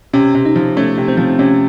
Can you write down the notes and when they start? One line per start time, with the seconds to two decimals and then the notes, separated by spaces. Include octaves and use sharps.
0.13 C3 C#4
0.35 C3
0.45 D#4
0.56 F3
0.77 A3 C#4
0.98 C3
1.08 C4
1.17 F3
1.39 C3 C#4